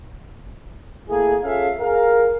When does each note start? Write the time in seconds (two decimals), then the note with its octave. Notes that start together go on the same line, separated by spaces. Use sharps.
1.09 A3 A#3 E4 G#4
1.44 C#4 F4 G#4 A4 E5 F5
1.80 G#4 A#4 F5